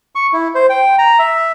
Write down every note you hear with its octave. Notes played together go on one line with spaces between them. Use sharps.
C#6
E4
C5
G5
A#5
E5